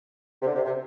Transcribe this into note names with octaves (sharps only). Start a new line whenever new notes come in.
C3
D3
C3
C3